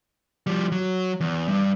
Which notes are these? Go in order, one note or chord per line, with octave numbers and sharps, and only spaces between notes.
F3 G3
F#3
E2
G2